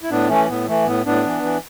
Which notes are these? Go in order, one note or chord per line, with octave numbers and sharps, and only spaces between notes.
E4
A2 B3 D4
E3 A3 C#4
A2 B3
E3 A3
A2 B3
A2 B3 D4
E3
E3